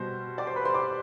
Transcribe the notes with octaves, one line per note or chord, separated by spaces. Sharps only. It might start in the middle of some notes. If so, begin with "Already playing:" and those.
Already playing: B2 G3 C5 C6
D5 D6
C5 C6
B4 B5
C5 C6
D5 D6